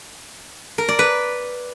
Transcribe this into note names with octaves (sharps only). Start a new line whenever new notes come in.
A#4
D5
B4